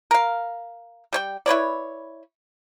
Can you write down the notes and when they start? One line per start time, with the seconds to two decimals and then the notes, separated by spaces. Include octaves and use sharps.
0.11 A#4 F5
1.13 G3 C#5 G5
1.46 E4 B4 C#5 D5